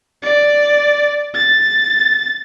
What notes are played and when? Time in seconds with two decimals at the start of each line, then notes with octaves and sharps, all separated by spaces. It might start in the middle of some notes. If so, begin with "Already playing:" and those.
0.23 D5
1.34 A6